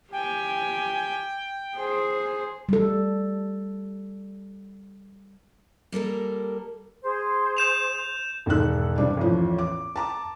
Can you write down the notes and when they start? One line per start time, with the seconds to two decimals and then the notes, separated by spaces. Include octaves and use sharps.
0.13 G4 G5 G#5
1.76 G#4 C5
2.69 G3 A4
5.92 G3 A#3 A4 A#4
7.03 G#4 C5
7.57 G6 E7 F7
8.46 E1 G#2 D#3 A4 F#6
8.98 G2 C3 D4
9.17 A1 E2 F3
9.58 D6
9.96 A5 A#5 D6